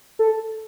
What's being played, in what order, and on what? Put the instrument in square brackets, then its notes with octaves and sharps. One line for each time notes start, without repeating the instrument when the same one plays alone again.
[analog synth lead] A4